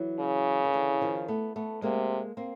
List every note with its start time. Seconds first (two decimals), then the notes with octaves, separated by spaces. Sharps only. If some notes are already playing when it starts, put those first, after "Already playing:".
Already playing: E3 F#3
0.20 C#3
0.64 D#3
0.74 D3 E3
1.01 D#3 F3
1.28 A3 B3
1.56 A3 B3
1.82 C3 G#3 A#3
2.37 A#3 C4